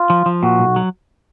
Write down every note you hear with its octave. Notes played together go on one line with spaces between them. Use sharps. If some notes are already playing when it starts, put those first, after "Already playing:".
Already playing: F4
F3
F3
A#2 F#4
B1
F#3